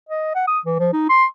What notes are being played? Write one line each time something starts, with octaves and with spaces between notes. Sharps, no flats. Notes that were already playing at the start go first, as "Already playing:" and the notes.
D#5
F#5
D#6
E3
F3
D#4
C6